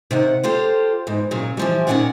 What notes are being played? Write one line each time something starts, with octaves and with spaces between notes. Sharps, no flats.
C3 D#3 F#5
F4 G4 A4 C5
E2 G#2
A#2 C#3 F#3
E3 F3 G3
A#2 D#3 E3 C#4 D5 F#5